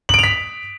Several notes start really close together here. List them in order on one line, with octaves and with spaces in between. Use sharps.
F#7 D7 F7 B6